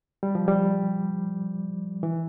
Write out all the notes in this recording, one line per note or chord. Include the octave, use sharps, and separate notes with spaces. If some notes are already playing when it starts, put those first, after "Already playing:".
G3
F3
G3
E3